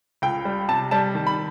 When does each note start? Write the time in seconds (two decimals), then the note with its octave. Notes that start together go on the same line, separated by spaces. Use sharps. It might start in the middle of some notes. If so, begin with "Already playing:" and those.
0.22 C#2 G5
0.45 G3
0.68 C3 A5
0.91 G3 A5
1.15 D#3
1.27 B5